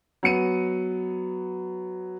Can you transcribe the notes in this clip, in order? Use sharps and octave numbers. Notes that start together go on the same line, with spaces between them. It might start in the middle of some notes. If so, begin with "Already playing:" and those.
F#3 B3 C#7 D#7